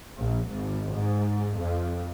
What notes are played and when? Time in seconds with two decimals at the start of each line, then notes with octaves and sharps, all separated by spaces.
0.19 A#1
0.49 G#1
0.94 G#2
1.61 F2